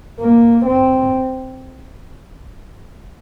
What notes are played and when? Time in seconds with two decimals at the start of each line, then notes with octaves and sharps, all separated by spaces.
0.20 A#3
0.66 C4